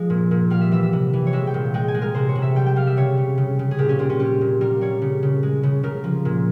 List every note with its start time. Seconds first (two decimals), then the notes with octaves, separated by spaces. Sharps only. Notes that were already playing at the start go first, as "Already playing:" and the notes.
Already playing: F3 G#3
0.10 A#2
0.31 A#2
0.50 G3 F5
0.61 E5
0.72 E3 E5
0.83 E5
0.93 C3
1.13 E3
1.27 C#5
1.33 G#3 E5
1.47 G5
1.54 A#2
1.74 G#3 G5
1.88 G#5
1.95 G#3
2.02 A#4
2.15 C3 C5
2.29 C#5
2.35 C3
2.42 E5
2.56 G3 G5
2.66 G5
2.76 G3 F5
2.87 E5
2.97 C#3 C#5
3.18 C#3
3.38 C#3
3.59 C#3
3.71 G#4
3.78 A#2 G4
3.89 C#4
3.99 A#2 C4
4.10 C#4
4.20 G3 G4
4.41 A#2
4.61 G3 A#4
4.81 G3 C#5
5.02 C#3
5.23 C#3
5.43 G#3
5.63 C#3
5.83 C#3 A#4
6.04 F3
6.25 A#2